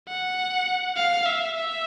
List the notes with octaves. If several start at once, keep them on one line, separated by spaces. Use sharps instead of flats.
F#5
F5
E5
E5